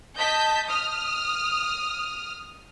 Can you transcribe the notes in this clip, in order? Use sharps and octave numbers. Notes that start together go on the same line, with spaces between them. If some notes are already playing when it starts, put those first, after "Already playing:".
D#5 A5 G6 B6
D#6 F6